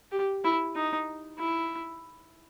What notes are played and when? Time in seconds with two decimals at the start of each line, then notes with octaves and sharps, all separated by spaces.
0.12 G4
0.44 E4
0.76 D#4
1.39 E4